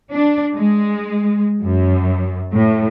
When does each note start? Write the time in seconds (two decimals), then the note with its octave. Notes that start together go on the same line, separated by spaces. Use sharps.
0.11 D4
0.56 G#3
1.64 F#2
2.54 A2